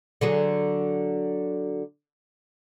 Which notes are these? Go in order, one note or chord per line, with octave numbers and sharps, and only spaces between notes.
D3 F#3 G#4